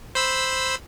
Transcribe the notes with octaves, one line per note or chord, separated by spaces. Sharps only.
C5 B5 E6